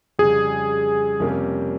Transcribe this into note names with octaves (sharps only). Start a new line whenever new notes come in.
F2 C#3 G3 G#4
F2 C3 G3 A#3 C#4